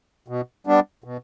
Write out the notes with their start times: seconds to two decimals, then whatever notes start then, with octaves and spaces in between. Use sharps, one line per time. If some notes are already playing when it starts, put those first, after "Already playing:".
0.28 B2
0.67 G3 B3 D4
1.04 B2